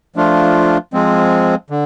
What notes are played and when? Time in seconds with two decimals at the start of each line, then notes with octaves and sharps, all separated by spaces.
0.16 F3 A3 D4 F4
0.93 F3 G#3 C4
1.70 D3